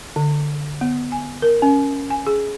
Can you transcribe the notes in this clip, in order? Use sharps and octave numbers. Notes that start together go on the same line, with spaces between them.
D3
B3
G#5
A#4
C#4
G#5
G#4